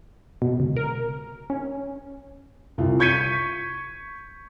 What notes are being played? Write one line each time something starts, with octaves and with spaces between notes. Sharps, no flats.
B2
C#2
A#4
C#4
C2 F4
C#6 G6 G#6 B6 C#7 D#7